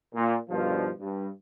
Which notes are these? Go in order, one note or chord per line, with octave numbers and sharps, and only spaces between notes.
A#2
G2 B2 D3 D#3 F3
G2